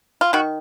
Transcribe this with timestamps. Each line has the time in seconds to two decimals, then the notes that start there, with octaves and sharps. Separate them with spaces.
0.21 F4
0.33 D#3 F#4